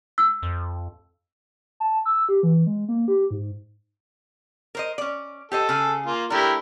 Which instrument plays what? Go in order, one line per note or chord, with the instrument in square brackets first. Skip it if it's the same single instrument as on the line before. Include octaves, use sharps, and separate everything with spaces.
[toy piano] E6
[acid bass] F2
[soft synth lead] A5
E6
G4
E3
G#3
A#3
G4
G#2
[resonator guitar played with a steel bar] A#4 C5 D#5
C#4 D5
[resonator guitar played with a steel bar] G4 C5 D#5 [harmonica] A4
[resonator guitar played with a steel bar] C#3 G#4
[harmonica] A#3 F4
[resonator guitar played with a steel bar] A3 D4 [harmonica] E4 G4 A#4